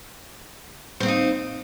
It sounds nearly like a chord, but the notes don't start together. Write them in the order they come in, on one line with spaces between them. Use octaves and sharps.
C5 C4 F5 D#4